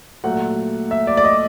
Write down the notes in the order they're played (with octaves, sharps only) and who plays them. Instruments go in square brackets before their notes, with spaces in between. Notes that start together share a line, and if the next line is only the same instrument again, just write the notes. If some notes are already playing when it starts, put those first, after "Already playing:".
[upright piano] A#2 F#3 A3 F#5
E5
D5
D5
D#5